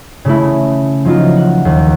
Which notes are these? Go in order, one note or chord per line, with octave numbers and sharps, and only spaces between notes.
C#3 A3 E4
F3 F#3 D#4 F4
F#5
D#2